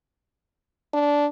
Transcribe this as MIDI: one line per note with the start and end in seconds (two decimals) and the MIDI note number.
0.94 1.27 62